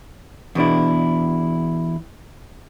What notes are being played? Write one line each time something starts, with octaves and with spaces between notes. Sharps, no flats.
E2 B2 D4 E4